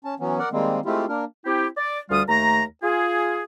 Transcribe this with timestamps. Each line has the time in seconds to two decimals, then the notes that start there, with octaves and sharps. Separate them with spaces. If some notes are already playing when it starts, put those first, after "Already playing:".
0.05 C#4 A5
0.20 E3 F#3 B3 C#4
0.39 A#4 D5 F#5
0.52 D#3 G3 G#3 A#3 C4
0.85 G#3 A3 C4 E4 F4 G4
1.08 A#3 D4 A#4
1.45 C4 E4 G4
1.77 D5
2.11 D2 G3 F4 D#6
2.28 D#2 A3 A#5
2.82 F4 G#4